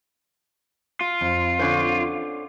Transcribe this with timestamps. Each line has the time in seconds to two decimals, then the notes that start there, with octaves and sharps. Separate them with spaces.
1.01 F4
1.21 F2
1.59 D3 C#4 C5